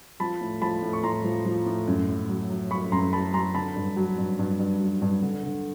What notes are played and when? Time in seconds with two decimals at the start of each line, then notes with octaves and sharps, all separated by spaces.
0.20 F3 A5 B5
0.41 A2
0.61 F3 A5 B5
0.82 A2
0.93 C#6
1.03 A2 A#5 C6
1.24 F3
1.45 F3
1.66 A2
1.87 F#2
2.08 F#2
2.29 F#3
2.50 F#3
2.71 F#3 B5 C#6
2.92 F#2 A#5 C6
3.13 F#3 A5 B5
3.34 F#3 A#5 C6
3.54 D3 A5 B5
3.76 G2
3.97 F#3
4.18 G2
4.39 G2
4.59 G2
4.81 F#3
5.01 G2
5.22 D3
5.43 D3